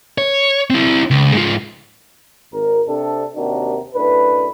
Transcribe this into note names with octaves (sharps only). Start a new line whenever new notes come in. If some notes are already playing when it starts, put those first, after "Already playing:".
C#5
C4 E4
C#2
G#2 F4
G#1 A#4
C3 D4 A4
D#2 C3 C4 D4 F#4 A#4
F#2 A2 D4 B4